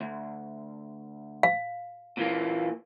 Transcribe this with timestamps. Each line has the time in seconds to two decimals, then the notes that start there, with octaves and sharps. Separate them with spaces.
0.01 D2
1.43 F5
2.17 A#2 E3 A#3